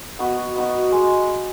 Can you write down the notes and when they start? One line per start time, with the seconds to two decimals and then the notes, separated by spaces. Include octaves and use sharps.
0.19 B3 D#4 F#4
0.56 B3 D#4 F#4
0.92 G#3